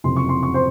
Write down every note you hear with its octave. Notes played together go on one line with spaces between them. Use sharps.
F#1 F2 C3 C6
C#6
C6
C#6
C5 C6